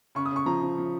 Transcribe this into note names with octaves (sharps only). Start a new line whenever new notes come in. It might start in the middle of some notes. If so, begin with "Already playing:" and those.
C#3 C#6
D#6
C#3 C#6
F3 A#5
F3
F3